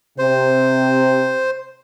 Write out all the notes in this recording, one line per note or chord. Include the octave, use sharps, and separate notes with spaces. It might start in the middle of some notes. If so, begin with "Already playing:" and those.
C3 C5